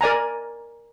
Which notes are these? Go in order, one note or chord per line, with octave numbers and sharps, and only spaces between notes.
A#4 D5 G#5 A#5